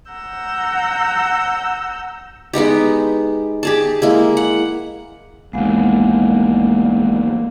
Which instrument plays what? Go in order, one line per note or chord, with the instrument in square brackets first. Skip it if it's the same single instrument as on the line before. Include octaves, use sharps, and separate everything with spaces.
[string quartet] F#5 A#5 E6 G6
[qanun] G#3 B3 D#4 G4
G4 G#4 A5
G#3 A#3 E4
F#5
[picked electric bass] A1 D#2 [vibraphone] G#3 B3 F#5 [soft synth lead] A#3